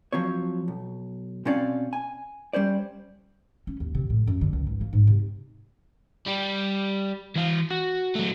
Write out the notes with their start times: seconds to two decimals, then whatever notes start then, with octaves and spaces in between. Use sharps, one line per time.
0.12 F3 F#3 C4 C#5
0.68 B1
1.45 B2 C4 C#4 D5 F5
1.93 G#5
2.53 G3 C#4 C5 D5
3.67 C#4
3.80 D#2
3.95 C3
4.10 A2
4.27 F#2
4.41 D3
4.53 C#2
4.67 G#1
4.81 A#3
4.93 G#2
5.07 C3
6.26 G3 G4
7.36 E3 F5
7.71 F#4
8.15 F#3 A3